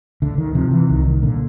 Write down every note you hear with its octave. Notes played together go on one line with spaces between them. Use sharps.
D2 D3
D#3
C3 F3
E3
C2 D#3
D#3
A#2 D3